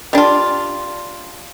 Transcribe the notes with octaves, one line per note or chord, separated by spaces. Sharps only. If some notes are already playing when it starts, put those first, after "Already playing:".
G3 D4 F4